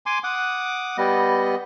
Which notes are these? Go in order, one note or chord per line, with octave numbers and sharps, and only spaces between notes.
G#5 C6 D6
F#5 D6 D#6
G3 B3 D#5